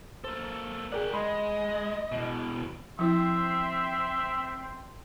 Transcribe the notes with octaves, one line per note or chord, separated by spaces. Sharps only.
A#3 A4 C5
G4 G#4 A#4 D5 F#5
G#3 D#5 B5 C6
E2 B2
F3 C4 E4 E5 G5 C6